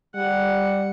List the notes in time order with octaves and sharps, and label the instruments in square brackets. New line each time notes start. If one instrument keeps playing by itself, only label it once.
[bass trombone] G3 [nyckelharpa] F#5